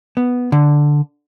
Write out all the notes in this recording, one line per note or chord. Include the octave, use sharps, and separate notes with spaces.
B3
D3